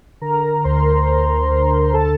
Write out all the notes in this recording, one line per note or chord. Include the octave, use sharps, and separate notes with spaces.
D3 A#4 A#5
D2 C5 C6
D2 A#4 A#5
D2
D3 A4 A5